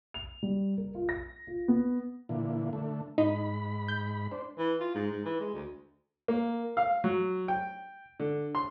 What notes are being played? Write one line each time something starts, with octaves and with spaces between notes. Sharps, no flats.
F7
G3
A#4
F4
A#6
F4
B3
A#2 D3 E3
D3 A3
G#2 D#4 B5
G6
D4 C5
E3
F4
G#2
G#2
E3
G#3
D2
A#3
F5
F#3
G5
D3
C6